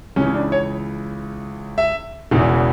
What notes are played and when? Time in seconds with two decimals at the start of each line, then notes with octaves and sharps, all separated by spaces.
0.16 C#2 C#3 E3 C#4
0.26 C#4
0.34 D4
0.52 C#5
1.78 E5
2.31 E1 E2 C#3 E3